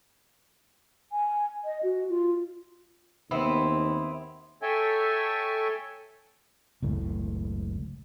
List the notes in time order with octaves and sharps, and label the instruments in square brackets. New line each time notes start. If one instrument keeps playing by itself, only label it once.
[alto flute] G#5
D#5
F#4
F4
[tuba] D#2 [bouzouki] B3 C4 E4
[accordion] A4 C#5 E5 G5 G#5
[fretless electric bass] F#1 C#2 A2